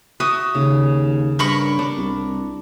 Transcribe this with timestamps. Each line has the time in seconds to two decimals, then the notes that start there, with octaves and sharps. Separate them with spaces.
0.20 F#4 E5 D#6
0.55 D#2 C#3
1.39 G2 A#4 B5 C#6
1.79 D4
1.97 C2